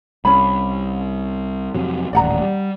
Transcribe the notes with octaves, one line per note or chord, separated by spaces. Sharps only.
C2 C#4 B5
F2 C3 F#3
D#1 A1 D5 F#5 A#5
G3